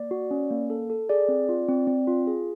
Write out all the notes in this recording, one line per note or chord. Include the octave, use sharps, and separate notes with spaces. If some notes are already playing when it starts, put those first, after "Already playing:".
Already playing: A#3 D5
F#4
C#4
A#3
A4
A4
G#4 D5
C4
F4
C4
C4
F4
G#4